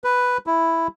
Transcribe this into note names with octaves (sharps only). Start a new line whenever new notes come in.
B4
E4